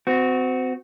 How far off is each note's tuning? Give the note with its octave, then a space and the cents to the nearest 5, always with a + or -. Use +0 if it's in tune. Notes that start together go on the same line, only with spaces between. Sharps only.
C4 -30 F#4 +0